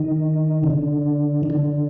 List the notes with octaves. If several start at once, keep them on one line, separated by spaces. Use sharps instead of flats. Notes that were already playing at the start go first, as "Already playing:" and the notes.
Already playing: D#3
C#3
D3
D#3
D3